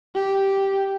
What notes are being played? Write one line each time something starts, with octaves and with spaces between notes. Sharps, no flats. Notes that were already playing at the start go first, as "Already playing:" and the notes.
G4